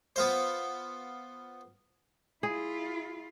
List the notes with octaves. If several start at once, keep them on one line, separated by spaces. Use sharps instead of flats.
B3 F4 C5
E4 F4 G#4